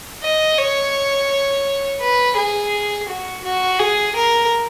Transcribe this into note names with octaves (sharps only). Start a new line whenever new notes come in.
D#5
C#5
B4
G#4
F#4
F#4
G#4
A#4